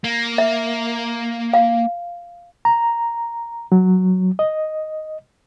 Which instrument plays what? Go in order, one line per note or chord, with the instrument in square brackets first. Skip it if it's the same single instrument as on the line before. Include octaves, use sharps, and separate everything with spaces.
[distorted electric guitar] A#3
[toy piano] E5
F5
[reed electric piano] A#5
F#3
D#5